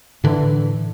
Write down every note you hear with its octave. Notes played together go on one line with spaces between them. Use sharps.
A2 D3 E3